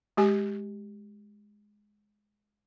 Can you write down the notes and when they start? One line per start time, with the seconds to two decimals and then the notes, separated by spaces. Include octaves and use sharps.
0.17 G#3 G4 G#5